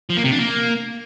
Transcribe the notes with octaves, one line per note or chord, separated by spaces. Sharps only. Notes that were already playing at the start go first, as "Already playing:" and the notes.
F3
A#3
C3
D4
A#3